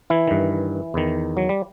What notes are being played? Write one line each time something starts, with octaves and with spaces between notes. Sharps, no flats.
E3 E4
G2 D#3
E2 D#3
F#3
G3